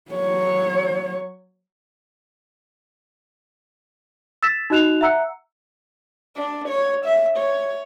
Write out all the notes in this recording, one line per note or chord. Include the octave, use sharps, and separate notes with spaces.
F#3 C#5
E6 A6 B6 E7
D#4 F#4 D#5 F#6 E7 F7
E5 F#5 A#5 E6 F#6 C#7
D4
C#5
E5
C#5